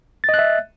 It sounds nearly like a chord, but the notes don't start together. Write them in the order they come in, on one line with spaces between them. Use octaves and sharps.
A6 D#5 F#6 E5